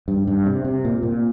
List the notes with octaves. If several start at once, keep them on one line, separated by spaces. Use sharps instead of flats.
G2
G2
C3
C3
A#2
A#2